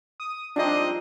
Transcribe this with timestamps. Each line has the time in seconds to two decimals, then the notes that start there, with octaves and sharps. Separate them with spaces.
0.20 D#6
0.56 F3 G3 G#3 C4 D4 D#4 D#5